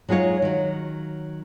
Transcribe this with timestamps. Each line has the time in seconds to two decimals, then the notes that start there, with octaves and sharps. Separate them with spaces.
0.09 F#3 G#3 D#4 F4 C#5
0.42 D#3 F#3